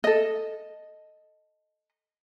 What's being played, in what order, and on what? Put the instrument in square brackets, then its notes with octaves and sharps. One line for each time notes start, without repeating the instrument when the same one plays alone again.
[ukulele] A4 D#5